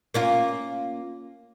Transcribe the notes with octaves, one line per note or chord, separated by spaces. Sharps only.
A#3 C#4 F4